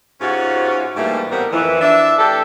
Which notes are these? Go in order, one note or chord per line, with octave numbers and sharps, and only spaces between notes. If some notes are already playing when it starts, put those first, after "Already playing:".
G#2 C3 C#4 F4 F#4
G#2 E3 G3 A3 A#3
A2 G3 B3 C4 A#4
F2 E3
D4 E5
E3 A3 G4 A4